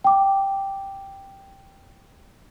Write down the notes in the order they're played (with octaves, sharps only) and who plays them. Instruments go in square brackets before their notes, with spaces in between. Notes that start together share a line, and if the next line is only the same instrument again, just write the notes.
[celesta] G5 D6